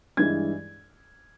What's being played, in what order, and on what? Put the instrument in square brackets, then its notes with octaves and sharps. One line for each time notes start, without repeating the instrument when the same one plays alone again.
[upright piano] G2 E3 G#3 G#6